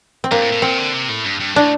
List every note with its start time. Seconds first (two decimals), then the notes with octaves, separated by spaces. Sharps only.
0.24 C4
0.31 G2 A#3
0.42 A2
0.53 A2
0.62 A#2 C4
0.78 D3
0.94 C3
1.09 A2
1.25 G2
1.40 G2
1.55 A2 D4